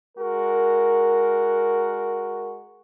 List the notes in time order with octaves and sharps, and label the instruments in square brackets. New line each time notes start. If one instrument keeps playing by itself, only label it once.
[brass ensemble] G#3 F#4 A#4